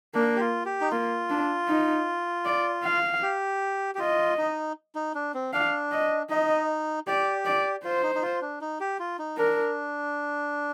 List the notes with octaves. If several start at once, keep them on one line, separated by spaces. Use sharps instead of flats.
A#3 D4
G4
F4
G4
D#4
A#3 F4
D4
D#4
D5
F5
G4
G4
F4 D#5
D#4
D#4
D4
C4
D4 F5
D#5
D#4 D#5
G4 D5
D5
F4 C5
D#4
D#4
F4
D4
D#4
G4
F4
D#4
D4 A#4